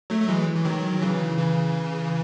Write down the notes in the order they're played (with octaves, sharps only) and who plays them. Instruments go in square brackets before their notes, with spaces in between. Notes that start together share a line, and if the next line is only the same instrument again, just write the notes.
[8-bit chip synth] F#3 A3
A3
E3 G#3
E3
D#3 F#3
F#3
C#3 E3
C#3 E3